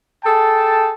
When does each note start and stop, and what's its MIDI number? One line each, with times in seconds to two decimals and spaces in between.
0.24 0.93 68
0.24 0.93 69
0.24 0.93 79
0.24 0.93 81